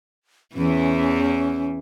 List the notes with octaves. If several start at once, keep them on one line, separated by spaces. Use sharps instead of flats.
E2 E3 C#4